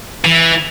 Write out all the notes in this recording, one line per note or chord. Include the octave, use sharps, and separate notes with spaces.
E3